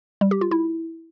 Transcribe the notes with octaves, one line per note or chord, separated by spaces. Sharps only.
G3
G4
F4
E4